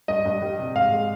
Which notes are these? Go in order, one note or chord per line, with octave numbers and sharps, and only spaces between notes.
G2 D#5
G2
G3
C3
G#2 F5
G#3